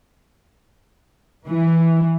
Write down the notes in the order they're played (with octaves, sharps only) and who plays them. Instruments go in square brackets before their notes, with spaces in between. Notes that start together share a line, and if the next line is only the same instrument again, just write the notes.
[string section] E3